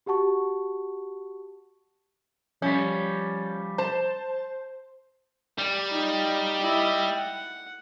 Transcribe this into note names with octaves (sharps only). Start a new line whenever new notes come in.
F#4 G4 F#5 A5 C#6
F3 G3 C#4
C5 A5
G3
D#4 F4
E4 D#5
F#5